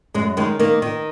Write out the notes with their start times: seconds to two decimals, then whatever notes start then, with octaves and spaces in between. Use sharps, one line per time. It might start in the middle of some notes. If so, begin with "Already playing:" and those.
0.14 F#2 G#3
0.37 D#3 G#3
0.59 D#3 A#3
0.82 D#3